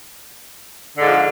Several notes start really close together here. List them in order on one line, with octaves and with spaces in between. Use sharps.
D3 G#2 F3